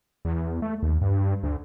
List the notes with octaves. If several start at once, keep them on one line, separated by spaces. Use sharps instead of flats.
E2
A3
D#2
G2
D2